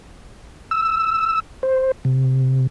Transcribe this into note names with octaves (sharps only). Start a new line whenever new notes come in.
E6
C5
C3